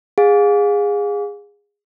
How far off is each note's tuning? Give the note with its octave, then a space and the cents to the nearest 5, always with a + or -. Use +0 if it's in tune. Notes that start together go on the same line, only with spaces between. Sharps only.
G#4 -15 F5 +35